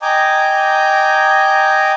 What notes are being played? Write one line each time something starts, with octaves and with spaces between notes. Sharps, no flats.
D#5 G5 G#5 A#5 D6